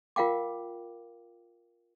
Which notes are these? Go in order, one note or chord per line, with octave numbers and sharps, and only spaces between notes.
F4 A#4 F5 G5 D6